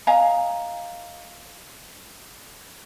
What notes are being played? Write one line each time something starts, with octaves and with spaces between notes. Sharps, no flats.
D#5 F5 G#5 A#5